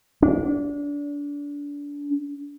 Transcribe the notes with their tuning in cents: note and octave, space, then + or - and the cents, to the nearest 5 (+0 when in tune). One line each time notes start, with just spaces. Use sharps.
D4 -30